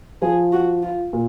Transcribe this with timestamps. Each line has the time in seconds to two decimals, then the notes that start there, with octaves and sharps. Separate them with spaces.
0.22 F3 G#4
0.53 F#4
0.83 F4
1.13 A#2